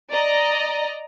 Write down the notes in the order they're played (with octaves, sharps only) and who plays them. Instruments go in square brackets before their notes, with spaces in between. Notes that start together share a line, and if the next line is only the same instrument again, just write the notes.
[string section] D5 D#5 A#5